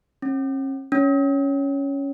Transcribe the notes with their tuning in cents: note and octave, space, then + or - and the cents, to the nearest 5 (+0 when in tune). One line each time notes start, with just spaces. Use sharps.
C#4 -45
C#4 +5